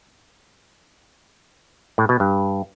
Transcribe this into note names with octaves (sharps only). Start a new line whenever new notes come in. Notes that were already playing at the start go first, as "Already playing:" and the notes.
A2
B2
G2